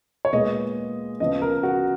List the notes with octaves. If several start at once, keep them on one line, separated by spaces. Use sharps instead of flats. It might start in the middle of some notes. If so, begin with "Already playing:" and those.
C#5
A#2 G#3 B3 D#5
C#3 F3 B3 D#5
A#4
F#4